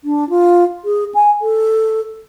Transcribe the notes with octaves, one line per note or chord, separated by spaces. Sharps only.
D4
F4
G#4
G#5
A4